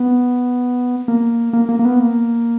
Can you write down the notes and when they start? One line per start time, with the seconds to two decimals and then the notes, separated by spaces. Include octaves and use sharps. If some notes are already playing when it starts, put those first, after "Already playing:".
Already playing: B3
1.08 A#3
1.53 A#3
1.69 A#3
1.79 A#3
1.85 B3
1.99 A#3